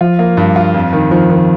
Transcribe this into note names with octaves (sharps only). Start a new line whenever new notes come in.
F3 F4
A#3
G2
F4
F2
D#3
D#3 F3
D#3